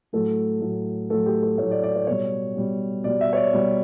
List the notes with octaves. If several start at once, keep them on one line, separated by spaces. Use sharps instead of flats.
A2 F#3 A3 A4
A2 F#3 A3
A2 F#3 A3 A4
G4
A4
A2 F#3 A3 C#5
D5
D5
C#5
B2 G3 C#5
B2 G3
B2 G3 D5
E5
C#5
D5
B2 G3